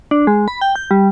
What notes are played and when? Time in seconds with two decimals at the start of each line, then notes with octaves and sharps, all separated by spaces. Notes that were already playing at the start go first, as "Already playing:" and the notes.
0.11 D4
0.27 G#3
0.48 B5
0.61 G5
0.76 G6
0.91 G3